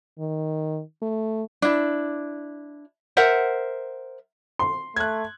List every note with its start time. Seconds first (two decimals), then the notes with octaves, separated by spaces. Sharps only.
0.19 D#3
1.02 A3
1.62 D4 E4
3.17 A#4 C5 E5 F#5
4.59 C6
4.96 A3 F#6 G#6